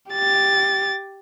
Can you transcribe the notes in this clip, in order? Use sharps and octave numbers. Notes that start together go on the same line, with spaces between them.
G4 A6